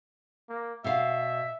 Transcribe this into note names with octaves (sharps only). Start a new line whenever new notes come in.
A#3
B2 E5 F5